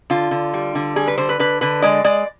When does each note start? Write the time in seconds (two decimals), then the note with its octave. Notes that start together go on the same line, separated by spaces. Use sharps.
0.10 D3 F4
0.31 D3
0.54 G3
0.75 D3
0.96 G3 G#4
1.08 B4
1.18 D3 C5
1.29 B4
1.39 D3 B4
1.61 D3 B4
1.82 G#3 D5
2.04 G#3 D5